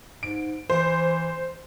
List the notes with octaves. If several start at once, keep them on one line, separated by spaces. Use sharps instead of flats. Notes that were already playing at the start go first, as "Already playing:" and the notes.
G#2 D7
E3 C5